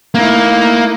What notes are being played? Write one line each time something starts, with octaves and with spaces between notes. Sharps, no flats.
A3 A#3 D#4 E4